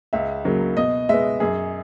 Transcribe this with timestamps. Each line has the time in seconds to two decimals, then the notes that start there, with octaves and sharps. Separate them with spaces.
0.13 C#2 E5
0.45 C#3 F#3 A#3
0.77 B2 D#5
1.09 G#3 B3 E5
1.40 F#2 G#4